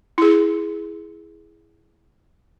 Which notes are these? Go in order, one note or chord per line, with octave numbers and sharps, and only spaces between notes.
E4 G#4